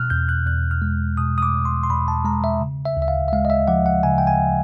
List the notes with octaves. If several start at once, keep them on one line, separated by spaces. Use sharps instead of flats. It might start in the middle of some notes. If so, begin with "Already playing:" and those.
Already playing: B2 F6 F#6
E2 G6
F#6
E2 F#6
F6
G#3
B2 D#6
D#6
D6
E2
C6
C6
E2 B5
A5
G#3 A#5
E5
C#3
E5
D2
E5
F5
E5
G#3 F5
D#5
E5
F3 F#5
F#5
C#3 G#5
G5
G#5